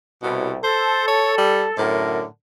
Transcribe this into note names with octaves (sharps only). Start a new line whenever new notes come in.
C2 B2
A4 C5
C#5
G3
F#2 A2 D3 A#4